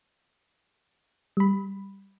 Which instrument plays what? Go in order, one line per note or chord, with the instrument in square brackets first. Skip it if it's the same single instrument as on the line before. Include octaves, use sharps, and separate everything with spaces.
[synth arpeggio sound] G3 B5